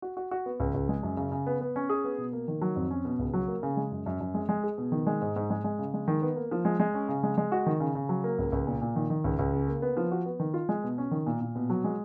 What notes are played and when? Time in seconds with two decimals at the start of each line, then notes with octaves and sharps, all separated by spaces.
0.02 F#4
0.17 F#4
0.31 F#4
0.46 B3
0.60 C#2
0.74 C#2
0.89 G#3
1.03 F#2
1.17 C#3
1.32 C#3
1.47 B3
1.61 B3
1.76 C#4
1.89 G#4
2.04 B3
2.18 B2
2.33 A#3
2.48 D#3
2.62 F#3
2.76 F2
2.91 C#4
3.05 B2
3.19 C#2
3.33 F#3
3.48 A#3
3.63 C#3
3.77 G#3
3.92 F#2
4.06 F#2
4.21 F#2
4.34 G#3
4.49 G#3
4.63 G#4
4.78 B2
4.92 D#3
5.07 G#3
5.21 G#2
5.36 G#2
5.50 G#3
5.64 G#3
5.79 C#3
5.94 G#3
6.08 D#3
6.22 B3
6.36 A#3
6.51 F3
6.65 G#3
6.80 G#3
6.94 C#4
7.09 C#3
7.23 G#3
7.38 G#3
7.52 F#4
7.66 D#3
7.80 C#3
7.95 C#3
8.09 F#3
8.24 A#3
8.39 C#2
8.52 C#2
8.67 A#2
8.81 A#2
8.96 D#3
9.10 D#3
9.24 C#2
9.39 C#2
9.53 C#3
9.68 A#3
9.82 B3
9.97 F3
10.12 F#4
10.26 B3
10.40 D#3
10.54 F4
10.69 G#3
10.84 B2
10.98 C#4
11.11 D#3
11.26 A#2
11.41 A#2
11.55 B2
11.70 F#3
11.84 G#3